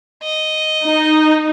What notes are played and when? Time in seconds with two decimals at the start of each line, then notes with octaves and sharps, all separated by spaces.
0.23 D#5
0.85 D#4